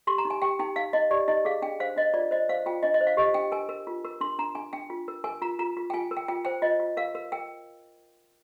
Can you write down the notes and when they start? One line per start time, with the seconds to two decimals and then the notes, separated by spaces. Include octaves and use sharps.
0.07 G4 C6
0.18 A#5
0.25 D#4
0.30 G#5
0.42 G4 G5
0.59 D#4 G5
0.76 D#4 F5
0.93 D#4 D#5
1.11 G4 D5
1.28 D#4 D#5
1.45 G#4 F5
1.62 D4 G5
1.80 C5 F5
1.96 D4 D#5
2.14 F4 D5
2.31 C5 D#5
2.49 C5 F5
2.66 F4 G5
2.83 D4 D#5
2.94 D#5
3.01 C5
3.07 F5
3.17 G4 D#5
3.34 D4 G5
3.52 A#4 G#5
3.69 A#4
3.87 F4
4.04 A#4
4.21 D4 C6
4.39 D4 A#5
4.55 D4 G#5
4.73 D4 G5
4.90 F4
5.08 A#4
5.24 A#4 G#5
5.42 F4 A#5
5.59 F4 A#5
5.77 F4
5.90 G5
5.94 F4 G#5
6.11 A#4
6.17 G5
6.28 F4 G5
6.45 C5 G5
6.62 F4 D#5
6.80 F4
6.97 A#4 F5
7.15 A#4
7.32 A#4 G5